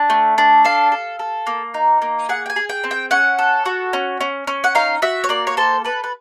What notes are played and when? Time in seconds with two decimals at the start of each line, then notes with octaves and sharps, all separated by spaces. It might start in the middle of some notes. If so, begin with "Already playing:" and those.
Already playing: D4
0.10 A3
0.38 D4
0.65 A4 F5
0.92 A4
1.19 A4
1.47 A#3
1.74 D#4
2.02 A#3
2.29 G#4 F#5
2.46 G5
2.50 G#5
2.56 G#4
2.69 G5
2.84 C4
2.91 G5
3.11 C#4 F#5
3.39 A4
3.66 F#4
3.93 C#4
4.21 C#4
4.47 C#4
4.64 F#5
4.75 D#4 F5
5.02 F#4 E5
5.24 C#5
5.29 A#3 D5
5.47 C#5
5.57 A4 C5
5.85 A4 B4
6.04 B4